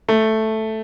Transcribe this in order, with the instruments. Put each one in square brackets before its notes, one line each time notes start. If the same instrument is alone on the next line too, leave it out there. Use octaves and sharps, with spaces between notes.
[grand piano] A3